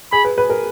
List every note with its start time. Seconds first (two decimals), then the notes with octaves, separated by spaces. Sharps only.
0.12 G#4 B5
0.25 B4
0.38 B4
0.50 A#4